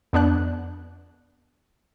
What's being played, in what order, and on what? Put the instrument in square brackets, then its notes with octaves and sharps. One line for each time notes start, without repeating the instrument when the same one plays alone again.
[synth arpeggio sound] F2 B3 D4 F#6